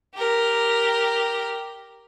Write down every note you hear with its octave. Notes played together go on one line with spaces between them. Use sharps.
G4 A#4